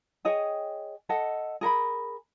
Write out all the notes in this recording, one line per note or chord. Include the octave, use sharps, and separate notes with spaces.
G#4 C#5 D#5 G5
A4 D#5 F#5
G#4 A#4 A#5 B5